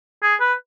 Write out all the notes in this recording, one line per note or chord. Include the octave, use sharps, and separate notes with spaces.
G#4
B4